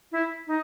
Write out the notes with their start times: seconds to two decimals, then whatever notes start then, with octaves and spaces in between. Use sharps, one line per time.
0.12 E4
0.47 D#4